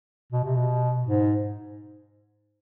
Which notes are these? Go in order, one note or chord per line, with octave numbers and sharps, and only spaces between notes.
B2
C3
B2
G#2